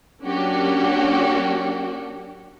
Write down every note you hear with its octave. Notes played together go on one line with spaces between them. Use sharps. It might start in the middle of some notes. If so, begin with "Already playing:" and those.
F#3 A#3 C#4 D4 F#4 G4